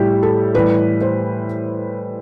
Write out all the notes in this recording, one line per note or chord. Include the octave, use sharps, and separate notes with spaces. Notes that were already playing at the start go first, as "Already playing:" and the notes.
Already playing: A2 G3 E4 G4
A4
A2 E3 G3 B4
C5